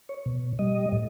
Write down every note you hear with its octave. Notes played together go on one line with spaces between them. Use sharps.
C#5
B2
G3 D#5
A2